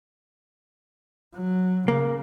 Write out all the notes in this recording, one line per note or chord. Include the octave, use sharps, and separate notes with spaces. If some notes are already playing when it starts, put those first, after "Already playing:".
F#3
C#3 A#3